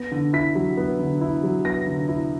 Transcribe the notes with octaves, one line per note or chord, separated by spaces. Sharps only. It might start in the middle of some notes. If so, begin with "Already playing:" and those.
Already playing: B3 A#6
D3
E4 B6
F#3
B3
D3
E4
F#3
B3 A#6
D3
E4